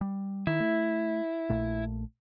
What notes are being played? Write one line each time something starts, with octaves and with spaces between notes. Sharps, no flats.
G3
D#3 E4
A3
A#1 A#2 A3